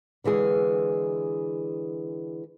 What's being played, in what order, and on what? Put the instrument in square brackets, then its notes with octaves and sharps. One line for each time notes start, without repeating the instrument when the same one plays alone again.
[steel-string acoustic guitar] D3 E3 G#3 G#4